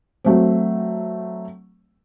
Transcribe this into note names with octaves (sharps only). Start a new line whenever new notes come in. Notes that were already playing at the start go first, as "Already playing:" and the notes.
F#3 A3 C4